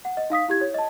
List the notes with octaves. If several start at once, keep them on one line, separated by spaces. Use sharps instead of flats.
F#5
D#5
D#4 F5 D#6 B6
E4 G4 G#6
C#5
D#5 A5